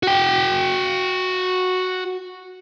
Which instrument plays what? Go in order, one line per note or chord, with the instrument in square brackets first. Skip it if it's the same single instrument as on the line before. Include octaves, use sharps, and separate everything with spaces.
[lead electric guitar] F#4 G5